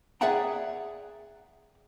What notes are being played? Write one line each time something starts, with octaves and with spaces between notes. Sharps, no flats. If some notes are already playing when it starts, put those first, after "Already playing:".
G#4 D5 E5 F#5 G5 A#5